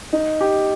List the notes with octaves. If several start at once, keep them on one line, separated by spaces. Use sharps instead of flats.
D#4
G4